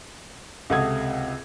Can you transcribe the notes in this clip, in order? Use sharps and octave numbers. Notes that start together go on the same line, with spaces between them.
C#2 C3 A4 F#5 D#6 G#6